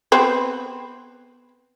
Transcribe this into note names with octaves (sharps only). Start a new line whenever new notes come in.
B3 C4 B4